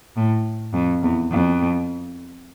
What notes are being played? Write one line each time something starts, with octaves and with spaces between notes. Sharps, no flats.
A2
F2
E2
F2